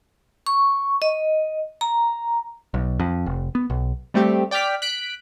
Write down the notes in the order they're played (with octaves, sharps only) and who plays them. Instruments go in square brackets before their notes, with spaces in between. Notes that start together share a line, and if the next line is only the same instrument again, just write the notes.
[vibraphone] C#6
D#5
A#5
[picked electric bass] B1
F2
F1
B3
B1
[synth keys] G3 A3 C4 G4
D5 G5 D6 F6 B6
F#6 B6 D7